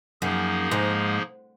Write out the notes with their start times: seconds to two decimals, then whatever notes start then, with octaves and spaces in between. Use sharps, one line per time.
0.22 F#2 F3 A#3 D#4 G#4
0.72 G#2